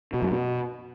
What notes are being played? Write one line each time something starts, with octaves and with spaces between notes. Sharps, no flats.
B2
F#2
B2